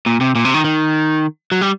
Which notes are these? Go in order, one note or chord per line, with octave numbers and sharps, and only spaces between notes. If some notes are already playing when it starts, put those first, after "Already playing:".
A#2
C3
A#2
C3
D#3
D#3
F#3
G3